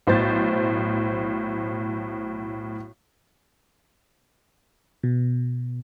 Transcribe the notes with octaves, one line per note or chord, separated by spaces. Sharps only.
B1 A2 C5 G6 A6
B2